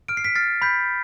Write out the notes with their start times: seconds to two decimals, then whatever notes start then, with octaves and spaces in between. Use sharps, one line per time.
0.08 F6 D7
0.17 C7
0.25 B6 D7
0.35 F6 A6 C7
0.62 B5 G6 B6